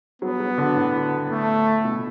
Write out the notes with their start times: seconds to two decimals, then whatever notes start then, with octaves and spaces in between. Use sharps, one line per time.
0.22 F#3 B3
0.40 F#3
0.58 D3
0.76 A2
1.30 A3
1.84 B2